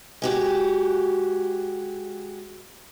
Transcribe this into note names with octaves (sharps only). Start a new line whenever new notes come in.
G#3 F#4 G4